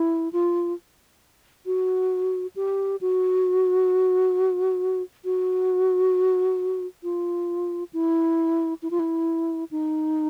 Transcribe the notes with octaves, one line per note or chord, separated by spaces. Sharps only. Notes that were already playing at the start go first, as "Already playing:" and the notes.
Already playing: E4
F4
F#4
G4
F#4
F#4
F4
E4
E4
F4
E4
D#4